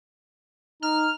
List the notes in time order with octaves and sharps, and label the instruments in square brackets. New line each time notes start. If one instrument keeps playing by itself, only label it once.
[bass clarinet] D#4 [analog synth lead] F6